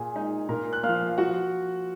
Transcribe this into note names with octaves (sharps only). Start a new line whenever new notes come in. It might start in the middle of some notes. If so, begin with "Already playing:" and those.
Already playing: A#2 G#4 G#5
G#3 D#4
A#2 A#4 A#5
F#6
F3 A#3 F5 F6
F5
F3 F#4 F#5